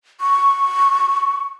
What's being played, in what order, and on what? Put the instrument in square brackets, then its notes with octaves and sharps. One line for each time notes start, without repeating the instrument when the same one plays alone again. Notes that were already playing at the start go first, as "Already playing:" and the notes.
[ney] C#6